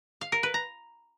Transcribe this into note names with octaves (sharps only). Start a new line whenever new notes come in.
F5
A#4
B4
A#5